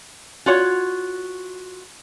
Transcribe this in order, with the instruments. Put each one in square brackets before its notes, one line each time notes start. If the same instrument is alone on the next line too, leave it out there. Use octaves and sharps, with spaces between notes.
[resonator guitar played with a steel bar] F4 F#4 C#5